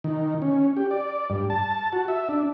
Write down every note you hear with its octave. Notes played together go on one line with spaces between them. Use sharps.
D#3
C#4
G4
D5
G2
A5
F#4
E5
D4